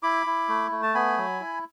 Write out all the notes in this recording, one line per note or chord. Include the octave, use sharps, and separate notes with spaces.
E4 B5 D6
E4
A3
A3
A5
B3 G#5 B5
F#3
E4